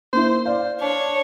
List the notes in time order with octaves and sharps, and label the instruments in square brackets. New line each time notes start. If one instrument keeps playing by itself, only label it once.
[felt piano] A#3 E4 [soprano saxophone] C5
[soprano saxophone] C5 [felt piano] D5 F5
[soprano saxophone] D4 [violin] C#5